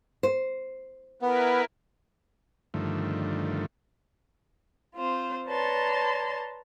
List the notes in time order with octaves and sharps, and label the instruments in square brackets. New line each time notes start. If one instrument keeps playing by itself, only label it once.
[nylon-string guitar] C5
[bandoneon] B3 [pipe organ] E4 A#4 B4
[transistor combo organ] G2 D3 D#3 F3 A3
[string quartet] C4 F4 C5
B4 C#5 D5 A5 A#5 C6